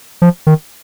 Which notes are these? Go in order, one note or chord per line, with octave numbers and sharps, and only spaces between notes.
F3
D#3